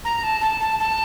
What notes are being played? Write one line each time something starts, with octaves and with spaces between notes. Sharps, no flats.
A#5
A5
A5
A5
A5